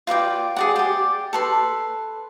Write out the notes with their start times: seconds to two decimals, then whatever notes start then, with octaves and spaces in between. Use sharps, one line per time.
0.07 F4 B4 D5 G5
0.56 G#4 D5 F#5
0.76 G4 D5
1.33 A4 B4 C6